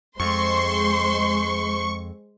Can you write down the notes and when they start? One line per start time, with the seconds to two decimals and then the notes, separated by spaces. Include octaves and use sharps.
0.20 F2 G#3 C5 C6 C#6